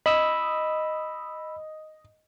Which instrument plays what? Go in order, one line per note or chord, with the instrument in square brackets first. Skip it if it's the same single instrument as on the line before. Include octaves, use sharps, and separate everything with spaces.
[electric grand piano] D#5 [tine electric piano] B5 D#6 E6